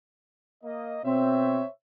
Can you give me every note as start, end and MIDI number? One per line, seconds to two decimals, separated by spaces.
0.64 1.00 58
0.64 1.00 75
1.04 1.60 47
1.04 1.60 60
1.04 1.70 72
1.04 1.70 73
1.04 1.70 76